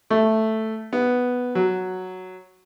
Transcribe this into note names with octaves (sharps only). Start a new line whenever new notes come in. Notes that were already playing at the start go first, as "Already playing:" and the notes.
A3
B3
F#3